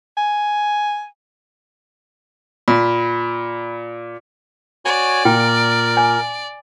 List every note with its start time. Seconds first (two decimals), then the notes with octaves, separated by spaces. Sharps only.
0.17 G#5
2.68 A#2 B5
4.85 F#4 C#5 D5 G#5
5.25 A#2 A#4 G5
5.97 G#5